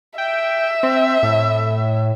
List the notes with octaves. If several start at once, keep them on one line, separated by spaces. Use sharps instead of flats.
E5 G5
C4
A2